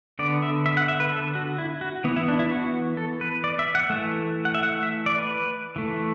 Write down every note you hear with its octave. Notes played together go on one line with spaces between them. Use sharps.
D3 B3 D5
E5
E5
F#5
E5
B4
A4
F#4
E4
F#4
E3 B3
E4
D4
E4
F#4
A4
B4
D5
E5
F#5
E3 A3 E5
F#5
E5
F#5
E5
D5
B4
E3 A3